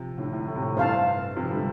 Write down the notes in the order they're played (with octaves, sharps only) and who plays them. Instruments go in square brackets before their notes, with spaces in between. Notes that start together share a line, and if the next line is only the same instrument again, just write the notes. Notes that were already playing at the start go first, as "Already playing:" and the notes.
Already playing: [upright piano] C3 F3
A2 D3
A2
A2
C3
A2
[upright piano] G2 C3 [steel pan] C5 F5 A5
[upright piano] C3 F3
D3 G3